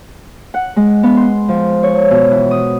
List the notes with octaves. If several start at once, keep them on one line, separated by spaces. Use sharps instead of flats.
F#5
G#3
B3
C6
F3
C#5
B2
E3
D#6